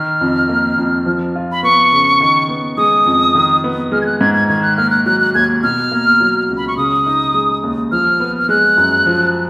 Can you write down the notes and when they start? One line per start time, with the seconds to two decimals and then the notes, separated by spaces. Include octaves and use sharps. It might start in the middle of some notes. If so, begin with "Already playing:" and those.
Already playing: D#3 F6
0.21 F2
0.49 A#3
0.78 F2
1.06 F3
1.36 F4
1.52 B5
1.63 B3 C#6
1.92 C#3
2.21 D#3
2.49 B3
2.77 G#3 D#6
3.06 F2
3.35 D#3
3.64 B3
3.92 G#3 F6
4.01 G#6
4.06 F#6
4.20 G#2 G#6
4.34 G#6
4.49 D#3 G#6
4.63 F#6
4.77 A#3 F6
4.90 F#6
5.06 F#3 F#6
5.20 F#6
5.35 D#2 G#6
5.63 B2 F6
5.92 A#3
6.20 F#3
6.50 C#2
6.57 B5
6.68 C#6
6.77 C#3 D#6
7.06 D#4
7.34 G#3
7.63 D#2
7.92 F3 F6
8.20 B3
8.39 F6
8.49 G#3 F#6
8.78 F#2
9.07 F3